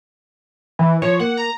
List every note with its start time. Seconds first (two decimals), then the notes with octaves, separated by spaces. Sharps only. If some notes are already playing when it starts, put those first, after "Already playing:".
0.79 E3
1.02 F3 C#5
1.20 A#3 F#5
1.37 A#5